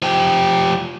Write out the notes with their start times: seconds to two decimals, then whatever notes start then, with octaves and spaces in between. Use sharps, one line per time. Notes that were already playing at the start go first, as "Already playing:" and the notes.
0.02 F3 G4